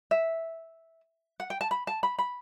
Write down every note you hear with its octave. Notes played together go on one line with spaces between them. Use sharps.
E5
F#5
G5
A5
B5
A5
B5
B5